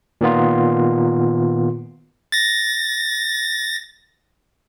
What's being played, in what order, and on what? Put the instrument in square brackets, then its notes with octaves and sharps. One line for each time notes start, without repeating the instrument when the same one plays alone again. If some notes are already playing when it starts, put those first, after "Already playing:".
[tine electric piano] A#2 D#3 B3 F4
[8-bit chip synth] A6 A#6